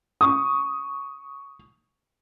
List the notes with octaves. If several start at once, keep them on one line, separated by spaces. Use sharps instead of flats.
C#6 D#6